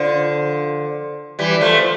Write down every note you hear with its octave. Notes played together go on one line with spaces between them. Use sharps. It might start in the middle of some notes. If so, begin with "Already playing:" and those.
Already playing: D3 F3
E3 G3
F3 A3